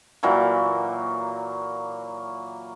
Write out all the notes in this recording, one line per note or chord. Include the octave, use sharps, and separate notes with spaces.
A#2 E3 F#3 A#3